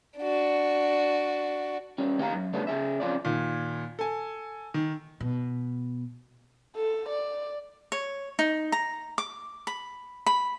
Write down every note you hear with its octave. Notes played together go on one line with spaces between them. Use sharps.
D4 F#4
G3 C#4
D#2 D#4 G4 C5 F5 A#5
F#2
C#3 G3 A3 B3 C#4 D4
C#3 G#4 E5
F2 C#4 F4 D5
D#2 A#2
A4 G#5
D#3
B2
A4
D5
C#5
D#4
A#5
D6
B5
B5